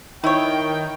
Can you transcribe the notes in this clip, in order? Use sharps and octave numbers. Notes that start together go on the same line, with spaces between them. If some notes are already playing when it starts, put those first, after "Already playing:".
D#3 E4 C#5 G5